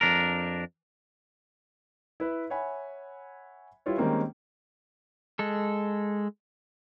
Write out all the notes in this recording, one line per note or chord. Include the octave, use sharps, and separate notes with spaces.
F2 D4 A#4
E4 B4
C#5 E5 F#5 G#5 B5
G3 E4 F4 B4 C#5
D#3 G3 G#3 A#3 C4 C#4
G#3 A4